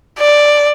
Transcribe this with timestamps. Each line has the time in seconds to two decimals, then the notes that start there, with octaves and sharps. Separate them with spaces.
0.19 D5